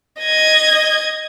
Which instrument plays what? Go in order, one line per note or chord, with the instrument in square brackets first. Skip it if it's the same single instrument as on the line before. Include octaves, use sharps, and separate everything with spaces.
[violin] D#5 G#6